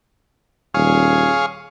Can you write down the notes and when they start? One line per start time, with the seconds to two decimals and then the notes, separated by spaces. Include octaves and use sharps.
0.74 D#1 G#4 C#5 F5